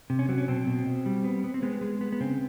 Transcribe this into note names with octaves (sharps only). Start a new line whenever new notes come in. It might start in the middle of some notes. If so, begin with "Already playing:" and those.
C3
C#4
F#3 C4
C#4
B2 C4
B2
B2
G3
B3
B3
C4
G#3 B3
G#3
B3
B3
C#3 C4